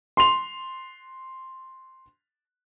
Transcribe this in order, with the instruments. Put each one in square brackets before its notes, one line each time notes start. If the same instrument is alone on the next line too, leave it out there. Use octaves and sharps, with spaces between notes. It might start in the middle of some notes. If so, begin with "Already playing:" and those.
[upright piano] C6 F7